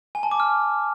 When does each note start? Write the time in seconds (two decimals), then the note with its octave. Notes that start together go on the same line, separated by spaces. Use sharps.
0.15 G#5
0.23 A5
0.31 D6
0.40 F6